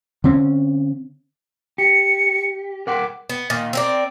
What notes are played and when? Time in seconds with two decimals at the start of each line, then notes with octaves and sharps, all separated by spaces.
0.24 D3 C4 C#4
1.78 G4 C#7
2.87 A#4 F#5 G5 D6
3.29 B3
3.50 A#2 D#3
3.73 C4 A#4 D5